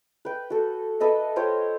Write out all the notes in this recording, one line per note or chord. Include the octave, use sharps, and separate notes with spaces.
B4 G5
F#4 A4
A4 B4 D#5 E5
F4 C5 C#5 G5